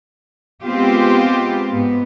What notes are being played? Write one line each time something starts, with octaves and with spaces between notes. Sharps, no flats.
G#3 B3 C4 F4 G4
G#2 B3